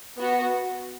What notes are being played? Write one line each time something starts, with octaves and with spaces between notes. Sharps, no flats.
B3 F#4